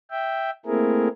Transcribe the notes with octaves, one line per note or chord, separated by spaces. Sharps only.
E5 G5
A3 A#3 C4 E4 G#4 A#4